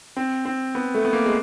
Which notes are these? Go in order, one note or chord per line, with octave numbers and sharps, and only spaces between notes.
C4
C4
B3
A3
B3
A#3
G#3